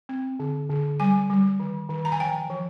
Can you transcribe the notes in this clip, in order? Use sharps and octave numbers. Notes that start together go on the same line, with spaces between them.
C4
D3
D3
G3 G#5
G3
D#3
D#3
A#5
G#5
F3 G5
F3